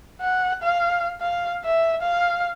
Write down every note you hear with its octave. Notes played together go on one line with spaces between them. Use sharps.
F#5
F5
F5
E5
F5